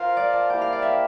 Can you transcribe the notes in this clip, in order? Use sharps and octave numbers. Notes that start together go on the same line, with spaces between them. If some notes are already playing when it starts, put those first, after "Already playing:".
Already playing: F4 A#4 C5 F5
D5
A5
A#3 E4 G4 A#4 G5
F5
D5
E5